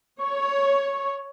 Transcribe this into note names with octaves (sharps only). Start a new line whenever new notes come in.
C#5 C#6